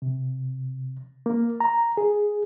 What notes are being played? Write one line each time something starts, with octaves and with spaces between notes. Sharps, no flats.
C3
A#3
A#5
G#4